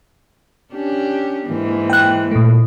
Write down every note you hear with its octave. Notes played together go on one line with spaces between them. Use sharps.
C#4 D4 G4
G#2 E3 A#3
G5 F#6
A#2 A3